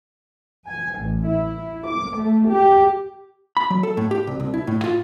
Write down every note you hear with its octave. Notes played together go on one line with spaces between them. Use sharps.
G#5
A1
E4
D6
A3
G4
B5
F#3
A4
A2
G4
C2
C2
E4
A2
F4